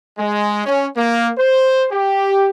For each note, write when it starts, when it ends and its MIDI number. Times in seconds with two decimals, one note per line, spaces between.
0.18 0.63 56
0.65 0.86 61
0.97 1.30 58
1.38 1.86 72
1.91 2.48 67